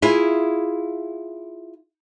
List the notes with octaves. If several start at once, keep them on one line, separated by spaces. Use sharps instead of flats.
E4 F4 G#4